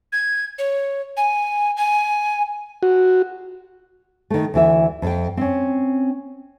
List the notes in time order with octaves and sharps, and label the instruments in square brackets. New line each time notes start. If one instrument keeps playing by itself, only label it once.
[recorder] G#6
C#5
G#5
G#5
[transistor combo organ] F#4
[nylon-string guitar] D#3 A3
D2 E3 E5
F2 G5
C4 C#4